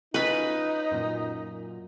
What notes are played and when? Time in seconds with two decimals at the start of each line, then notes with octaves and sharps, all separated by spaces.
0.14 C#4 D#4 F4 B4 B5
0.91 F#2 A#2